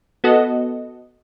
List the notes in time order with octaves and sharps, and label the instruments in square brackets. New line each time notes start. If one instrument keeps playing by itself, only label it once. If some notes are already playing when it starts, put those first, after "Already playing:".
[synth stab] B3 F#4 A4 D#5